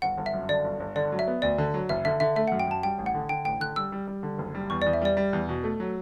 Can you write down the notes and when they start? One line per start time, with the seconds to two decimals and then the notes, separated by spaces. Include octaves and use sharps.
0.02 G1 F#5
0.17 G1
0.26 E5
0.34 F#2
0.49 D3 D5
0.64 G1
0.80 G1
0.96 D3 D5
1.12 F#3
1.19 E5
1.27 B3
1.42 D2 D5
1.58 D3
1.74 F#3
1.89 F#1 E5
2.05 D3 E5
2.20 D3 E5
2.36 A3 E5
2.48 F#5
2.52 F#2
2.59 G5
2.67 F#2 A5
2.83 G3 G5
2.99 A1
3.06 F#5
3.14 D3
3.29 D3 G5
3.45 A1 G5
3.60 D3 F#6
3.76 G3 E6
3.92 G3
4.08 G3
4.23 D3
4.38 F#1
4.55 G3
4.70 E2 C#6
4.82 D5
4.86 E2
4.93 E5
5.01 G3 D5
5.17 G3
5.33 E2
5.49 B2
5.63 A3
5.80 F#3